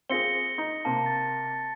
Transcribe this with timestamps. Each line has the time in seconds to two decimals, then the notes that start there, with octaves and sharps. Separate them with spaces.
0.09 C4 F4 G#4 A#6 C#7 G7
0.58 D#4
0.85 C3 A#3 A5
1.06 A6